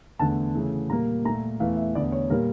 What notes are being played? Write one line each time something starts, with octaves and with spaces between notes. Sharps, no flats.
E2 D3 A3 A5
C#3 E3 A3
A#2 G3 A#3 A#5
A#2 A3 A#5
E2 E3 A3 F5
E5
E2 D3 A3 D5
C#5
A#2 G3 A#3 A#4